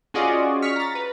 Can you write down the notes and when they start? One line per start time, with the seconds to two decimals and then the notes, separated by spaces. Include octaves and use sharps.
0.14 C#4 F4 F#4 G#4 D5 D#5
0.62 C#6 F6 B6
0.76 A#5 A6
0.95 B4